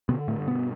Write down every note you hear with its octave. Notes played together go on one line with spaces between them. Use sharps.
B2 D3 B3
A2 A3
G2
B2 B3